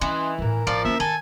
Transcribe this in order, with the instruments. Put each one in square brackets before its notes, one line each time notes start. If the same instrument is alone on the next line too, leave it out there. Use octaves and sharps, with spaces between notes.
[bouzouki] E3 [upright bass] C#4 [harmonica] D#5 C6
[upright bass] A2 D#3 [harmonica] A#4
[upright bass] A1 [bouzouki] F3 [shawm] D5
[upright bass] A#3 C#4 [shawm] E5
[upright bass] D#3 [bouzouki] A4 [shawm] G#5